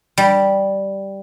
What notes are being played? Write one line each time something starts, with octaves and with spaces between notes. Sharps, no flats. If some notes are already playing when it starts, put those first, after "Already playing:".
G3